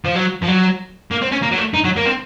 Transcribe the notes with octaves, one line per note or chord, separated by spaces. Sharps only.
F3
F#3
F3
F#3
A#3
C4
C#4
A#3
F#3
A3
D#4
F#3
A#3
C4